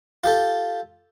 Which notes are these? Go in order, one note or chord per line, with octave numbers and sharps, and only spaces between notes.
F4 G4 A4